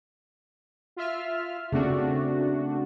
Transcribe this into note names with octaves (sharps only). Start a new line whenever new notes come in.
F4 E5 F6
C#3 A3 C4 D4 F#4